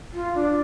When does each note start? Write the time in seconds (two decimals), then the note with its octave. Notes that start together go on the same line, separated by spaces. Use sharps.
0.14 F4
0.35 D4